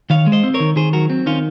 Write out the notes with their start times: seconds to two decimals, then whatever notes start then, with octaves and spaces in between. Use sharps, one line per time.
0.10 D#3 C#5 F5
0.27 G#3
0.32 C5 D#5
0.43 C4
0.54 A#4 C#5
0.60 D#3
0.76 D#3 G#4 C5
0.93 F#3 F#4 A#4
1.10 C4
1.26 D#3 C#4 F4